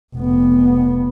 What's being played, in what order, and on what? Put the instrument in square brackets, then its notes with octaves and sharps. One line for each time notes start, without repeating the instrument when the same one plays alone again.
[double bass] F1 B3